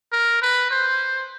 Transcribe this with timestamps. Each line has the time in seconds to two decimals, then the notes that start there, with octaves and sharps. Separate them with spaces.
0.12 A#4
0.42 B4
0.71 C5